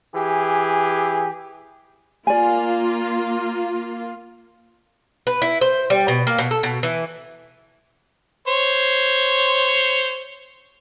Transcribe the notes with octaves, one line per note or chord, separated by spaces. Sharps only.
E3 G4 G#4
A#3 F4 D5 G#5
B4
E4
C5
G3
B2
A#3
B2
A4
B2
E3
C5 C#5